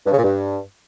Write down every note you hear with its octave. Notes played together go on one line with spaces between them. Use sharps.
G2
C#3
A#2
G2